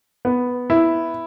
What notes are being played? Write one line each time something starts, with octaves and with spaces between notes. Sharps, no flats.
B3
E4